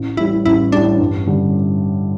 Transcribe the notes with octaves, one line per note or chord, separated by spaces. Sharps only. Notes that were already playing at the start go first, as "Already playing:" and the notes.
Already playing: A1
A2 E3 G3 E4
A1 E4
A2 E3 G3 D4
G2
D3 G3